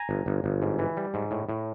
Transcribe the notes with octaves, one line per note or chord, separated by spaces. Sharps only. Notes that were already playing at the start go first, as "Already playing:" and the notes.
Already playing: G#5 A#5
G1
G1
G1
G#2
E3
G3
G#2
A2
A2